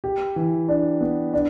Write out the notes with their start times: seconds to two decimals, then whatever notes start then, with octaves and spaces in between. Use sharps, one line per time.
0.04 G4
0.36 E3
0.68 D4
1.01 B3
1.33 D4